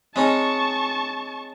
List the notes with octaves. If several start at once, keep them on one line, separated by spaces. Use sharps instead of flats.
G#3 C4 C#4 D#4 A5 C#6